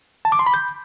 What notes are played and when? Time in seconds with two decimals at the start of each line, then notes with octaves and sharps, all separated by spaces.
0.25 A5
0.32 D6
0.39 C6
0.46 B5
0.54 G6